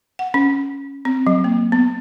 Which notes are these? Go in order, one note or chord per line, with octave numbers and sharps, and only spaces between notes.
F#5
C#4
C4
F#3
A#3
B3